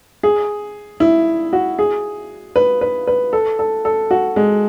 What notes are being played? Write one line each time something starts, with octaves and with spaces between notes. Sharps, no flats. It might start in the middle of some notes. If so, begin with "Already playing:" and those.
G#4
E4
F#4
G#4
B4
B4
B4
A4
A4
A4
F#4
G#3